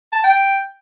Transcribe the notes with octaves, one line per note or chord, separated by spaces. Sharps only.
A5
G5